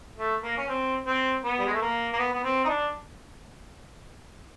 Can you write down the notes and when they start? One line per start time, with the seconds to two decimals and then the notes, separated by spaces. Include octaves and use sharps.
0.17 A3
0.42 A#3
0.57 C#4
0.68 C4
1.06 C4
1.43 B3
1.59 G3
1.66 G#3
1.74 A3
1.82 A#3
2.13 A#3
2.19 B3
2.33 B3
2.44 C4
2.65 D#4
2.69 D4